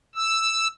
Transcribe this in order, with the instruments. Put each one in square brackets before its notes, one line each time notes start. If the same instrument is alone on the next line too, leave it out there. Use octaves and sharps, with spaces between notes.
[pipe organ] E6